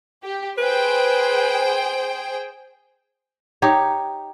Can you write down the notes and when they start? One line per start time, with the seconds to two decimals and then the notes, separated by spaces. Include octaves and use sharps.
0.23 G4
0.58 G#4 B4 C5 G5
3.62 D#4 G4 C#5